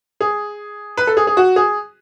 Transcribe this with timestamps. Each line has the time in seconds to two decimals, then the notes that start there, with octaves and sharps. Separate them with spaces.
0.21 G#4
0.97 B4
1.07 A4
1.17 G#4
1.27 G#4
1.37 F#4
1.56 G#4